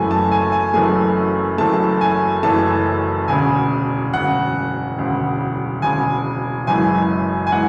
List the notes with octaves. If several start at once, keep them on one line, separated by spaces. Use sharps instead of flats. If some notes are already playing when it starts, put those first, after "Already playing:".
Already playing: F#1 F#2 E3 A3 G#5
A5
G#5
G#5
F#1 F#2 E3 A3 G#5
F#1 F#2 E3 A3 A5
G#5
F#1 F#2 E3 A3 A5
E1 D2 C#3 G#5
E1 D2 C#3 F#5
E1 D2 C#3
E1 D2 C#3 G#5
F#1 F#2 E3 G#3 G#5
G#5
E3 G#3 F#5